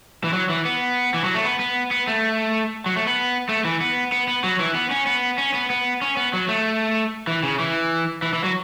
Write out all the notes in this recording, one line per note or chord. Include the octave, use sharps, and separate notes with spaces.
E3
F#3
E3
B3
E3
F#3
A3
B3
B3
B3
A3
F#3
A3
B3
A3
E3
B3
B3
B3
F#3
E3
B3
C#4
B3
C#4
B3
B3
C#4
B3
F#3
A3
E3
C#3
E3
E3
E3
F#3